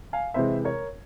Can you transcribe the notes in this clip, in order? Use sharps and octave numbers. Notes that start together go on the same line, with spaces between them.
F5 G#5
C3 E3 G#3 C5 E5
A#4 C#5